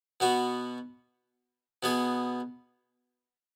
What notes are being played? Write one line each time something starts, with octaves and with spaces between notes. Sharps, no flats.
B2 B3 F#4
B2 B3 G#4